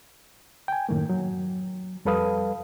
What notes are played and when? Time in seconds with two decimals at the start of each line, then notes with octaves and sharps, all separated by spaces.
0.68 G5 G#5
0.89 F#2 A2 D#3 A3 A#3
1.09 F#3
2.05 F2 G3 A4 B4 F5 D#6